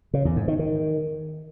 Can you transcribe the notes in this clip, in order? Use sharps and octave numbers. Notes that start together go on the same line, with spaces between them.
C#3
E2
G#2
D#3
D#3